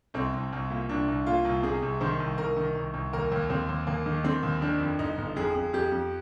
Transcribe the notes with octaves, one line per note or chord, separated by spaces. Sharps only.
C2 C4
C2
C2
A#2
C2 D4
C2
A#2 F4
C2
C3 G#4
C2
D#3 C5
C2
C2 A#4
D#3
C2
C2
D#2 A#4
D#2
D#2 C4
D#2
D#2 A#3
D#3
D#3 C4
D#2
D#3 D4
F2
G1 D#4
G1
F2 G#4
F2
F2 G4
F2